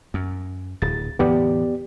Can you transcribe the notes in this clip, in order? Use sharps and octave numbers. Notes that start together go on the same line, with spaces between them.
F#2
D1 A6
E2 A2 D3 B3 G4 D5